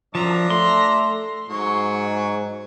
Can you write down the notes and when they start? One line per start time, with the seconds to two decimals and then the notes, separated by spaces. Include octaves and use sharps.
0.15 F#2 F3 D4 E5 A#5
0.50 A3 C6
1.50 G#2 F#3 C#6